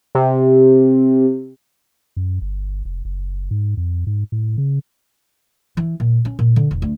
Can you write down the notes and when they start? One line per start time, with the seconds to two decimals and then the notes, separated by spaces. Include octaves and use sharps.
0.15 C3
2.17 F#2
2.41 G1
2.85 F1
3.05 F#1
3.51 G#2
3.77 F2
4.07 G#2
4.32 A2
4.58 C#3
5.77 E3
6.00 A#2
6.25 C#4
6.39 A#2
6.56 D3
6.71 E1
6.82 D2